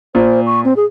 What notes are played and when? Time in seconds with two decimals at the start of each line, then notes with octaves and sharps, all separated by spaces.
0.15 A#2 C5
0.46 C#6
0.64 C4
0.76 G#4